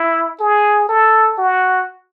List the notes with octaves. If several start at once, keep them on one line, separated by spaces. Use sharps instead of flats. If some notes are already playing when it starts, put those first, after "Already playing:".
Already playing: E4
G#4
A4
F#4